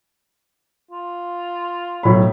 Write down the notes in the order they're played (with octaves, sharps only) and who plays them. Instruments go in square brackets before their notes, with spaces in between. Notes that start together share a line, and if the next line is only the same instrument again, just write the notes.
[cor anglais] F4
[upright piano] B1 A2 B5